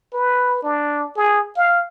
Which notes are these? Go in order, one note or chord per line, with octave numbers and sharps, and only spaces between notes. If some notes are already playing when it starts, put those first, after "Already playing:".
B4
D4
G#4
F5